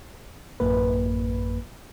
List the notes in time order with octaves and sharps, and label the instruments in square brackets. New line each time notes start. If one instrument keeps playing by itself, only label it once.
[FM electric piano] A1 F#2 A#3 B4